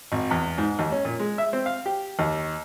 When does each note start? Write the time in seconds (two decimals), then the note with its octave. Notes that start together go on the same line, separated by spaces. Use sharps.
0.12 G#1
0.31 E2
0.58 G#2
0.79 D#2
0.92 C#4
1.05 A#2
1.20 G#3
1.38 E5
1.53 C4
1.66 F5
1.86 G4
2.19 D#2